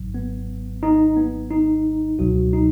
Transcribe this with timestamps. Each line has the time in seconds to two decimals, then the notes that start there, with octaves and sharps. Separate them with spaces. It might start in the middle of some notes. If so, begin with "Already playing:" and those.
Already playing: G#1 G#2 F#3
0.14 B3
0.83 D#4
1.17 B3
1.51 D#4
2.19 C#2 B2 F#3 F#4
2.53 D#4